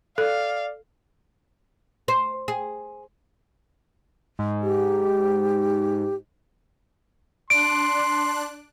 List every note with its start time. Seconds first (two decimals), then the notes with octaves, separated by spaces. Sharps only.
0.18 A4 D5 F5
2.08 C5
2.48 G#4
4.39 G#2
4.62 G4
7.50 D4 C6 F#6 D7